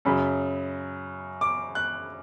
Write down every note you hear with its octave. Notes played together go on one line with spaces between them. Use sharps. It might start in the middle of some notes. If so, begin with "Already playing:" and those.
F#2 C#3 F#3 B5
D6
F#6